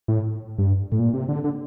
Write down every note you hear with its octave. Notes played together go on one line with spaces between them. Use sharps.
A2
G2
A2
A#2
C3
D3
D3